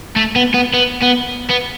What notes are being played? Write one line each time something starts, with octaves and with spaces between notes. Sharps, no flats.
A3
B3
B3
B3
B3
B3